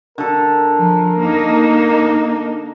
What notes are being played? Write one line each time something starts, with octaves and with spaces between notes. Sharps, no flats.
D3 A4 A#4
F3
A#3 D#4